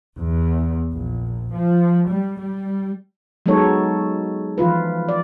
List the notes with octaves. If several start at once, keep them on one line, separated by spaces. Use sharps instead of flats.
E2
A#1
F3
G3
G3
F#3 G#3 B3 D#4 A4 C#5
E3 F3 F4 B4
D5